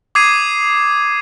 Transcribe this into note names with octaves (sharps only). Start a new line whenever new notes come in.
D6 D#6 G#6 C7 D#7